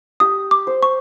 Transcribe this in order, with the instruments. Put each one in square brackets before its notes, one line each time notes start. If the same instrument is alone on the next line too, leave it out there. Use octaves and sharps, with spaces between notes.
[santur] G4 [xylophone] D#6
[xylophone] D6
[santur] C5
[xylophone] C#6